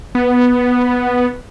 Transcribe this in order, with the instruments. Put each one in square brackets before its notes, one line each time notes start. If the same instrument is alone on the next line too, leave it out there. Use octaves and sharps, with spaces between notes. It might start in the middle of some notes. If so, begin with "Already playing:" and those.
[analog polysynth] B3